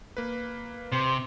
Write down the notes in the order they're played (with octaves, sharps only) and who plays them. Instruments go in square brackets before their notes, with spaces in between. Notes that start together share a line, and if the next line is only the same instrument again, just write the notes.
[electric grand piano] A#3 B4
[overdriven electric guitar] C3 [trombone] C5